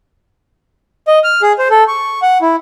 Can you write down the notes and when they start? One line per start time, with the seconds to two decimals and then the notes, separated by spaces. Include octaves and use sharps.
1.08 D#5
1.24 F6
1.42 G#4
1.59 C5
1.70 A4
1.88 C#6
2.22 F#5
2.42 E4